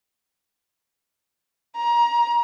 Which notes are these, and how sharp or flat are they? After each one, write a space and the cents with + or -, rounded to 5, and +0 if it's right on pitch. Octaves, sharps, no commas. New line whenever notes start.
A#5 +25